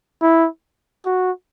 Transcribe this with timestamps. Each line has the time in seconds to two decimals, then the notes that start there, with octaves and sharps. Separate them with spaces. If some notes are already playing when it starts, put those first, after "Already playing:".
0.22 E4
1.06 F#4